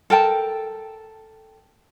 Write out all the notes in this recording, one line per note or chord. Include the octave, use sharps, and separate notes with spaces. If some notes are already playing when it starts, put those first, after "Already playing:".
A4 A#4 G5 A5